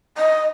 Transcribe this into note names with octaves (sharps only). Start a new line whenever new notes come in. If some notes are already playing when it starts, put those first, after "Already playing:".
D#5